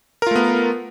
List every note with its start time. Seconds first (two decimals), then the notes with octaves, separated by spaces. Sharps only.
0.22 A#4
0.27 F4
0.31 A3
0.36 B3